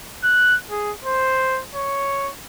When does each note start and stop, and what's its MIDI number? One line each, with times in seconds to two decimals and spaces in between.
0.24 0.56 90
0.70 0.92 68
1.05 1.61 72
1.75 2.30 73